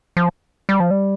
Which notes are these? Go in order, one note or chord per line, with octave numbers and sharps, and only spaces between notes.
F3
G3
F3
G3